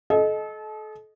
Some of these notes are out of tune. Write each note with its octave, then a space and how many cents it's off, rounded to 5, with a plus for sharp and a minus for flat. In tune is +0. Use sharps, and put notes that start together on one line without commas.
A4 -35 D#5 +0